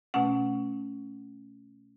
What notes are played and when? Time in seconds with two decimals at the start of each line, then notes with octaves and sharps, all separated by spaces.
0.14 B2 A3 C#4 F#5